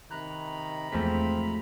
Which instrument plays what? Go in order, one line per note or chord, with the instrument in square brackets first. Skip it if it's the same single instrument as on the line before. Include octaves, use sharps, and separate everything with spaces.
[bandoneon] C3 A#5 B5 [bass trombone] D#3 [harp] F#6
[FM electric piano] E2 B6 [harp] G#2 F3 A3 [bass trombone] C4